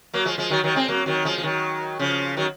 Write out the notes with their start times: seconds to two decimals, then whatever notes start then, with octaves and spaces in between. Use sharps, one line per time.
0.14 F#3 A#3
0.25 F3 G#3
0.38 F3 G#3
0.50 D#3 F#3
0.64 D#3 F#3
0.75 G#3 C4
0.88 F#3 A#3
1.06 D#3 F#3
1.25 F3 G#3
1.38 F3
1.43 D#3 F#3
1.99 C#3 F3
2.37 D#3 F#3